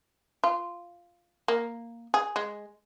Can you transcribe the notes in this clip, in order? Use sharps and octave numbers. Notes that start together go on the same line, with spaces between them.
F4
A#3
G#4
G#3